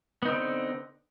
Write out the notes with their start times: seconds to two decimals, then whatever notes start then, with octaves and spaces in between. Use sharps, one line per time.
0.23 B3
0.25 D#4
0.28 C4
0.31 D3